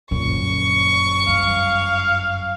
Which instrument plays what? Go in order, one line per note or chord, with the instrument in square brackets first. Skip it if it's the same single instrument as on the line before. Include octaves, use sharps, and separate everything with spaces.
[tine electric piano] G1 F#2 [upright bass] A#2 D3 [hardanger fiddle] C#6
[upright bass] G2 [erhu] F5